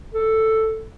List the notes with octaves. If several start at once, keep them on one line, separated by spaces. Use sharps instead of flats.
A4